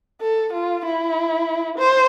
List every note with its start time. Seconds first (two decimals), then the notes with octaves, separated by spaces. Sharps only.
0.21 A4
0.53 F4
0.85 E4
1.78 C5